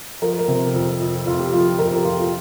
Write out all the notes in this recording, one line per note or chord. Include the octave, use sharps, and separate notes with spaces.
F3 A#4
A#4
C3
F2
F2
F2 F4
G4
F3 F4
F2 A#4
G4
F2 F4
F4